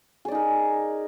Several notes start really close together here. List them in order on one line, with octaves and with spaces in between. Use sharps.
G#4 D5 D#4 A#4